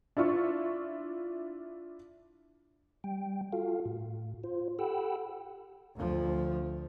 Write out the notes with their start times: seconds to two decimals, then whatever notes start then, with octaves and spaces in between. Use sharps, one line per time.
0.17 D4 E4 F4 C#6
3.04 G3 G5
3.52 F4 F#4 A4 F5
3.85 A2
4.44 F4 C5
4.79 G4 A4 F#5 G5 B5 E6
5.96 D2 F3